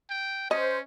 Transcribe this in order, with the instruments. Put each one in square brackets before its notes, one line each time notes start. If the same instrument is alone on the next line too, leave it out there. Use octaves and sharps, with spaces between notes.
[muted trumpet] G5
[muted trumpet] C#4 [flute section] C5 [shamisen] D#5